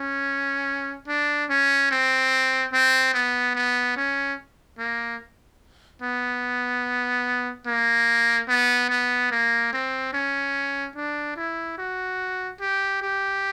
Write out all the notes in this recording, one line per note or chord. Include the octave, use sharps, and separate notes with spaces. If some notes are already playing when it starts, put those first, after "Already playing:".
Already playing: C#4
D4
C#4
C4
C4
B3
B3
C#4
A#3
B3
A#3
B3
B3
A#3
C4
C#4
D4
E4
F#4
G4
G4